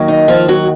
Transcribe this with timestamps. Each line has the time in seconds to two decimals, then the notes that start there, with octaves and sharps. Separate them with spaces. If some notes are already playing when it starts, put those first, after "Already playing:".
Already playing: D#2 D#3 F#3
0.08 D#4
0.28 F3 F4
0.48 F#3 F#4